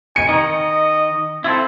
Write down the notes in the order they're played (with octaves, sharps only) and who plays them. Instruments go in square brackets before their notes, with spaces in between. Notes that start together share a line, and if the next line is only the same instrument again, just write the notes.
[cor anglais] G#5 [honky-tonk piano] C#7
[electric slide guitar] D#3 D#4 [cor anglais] D#5
[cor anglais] C4 [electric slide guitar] E4 F4 A4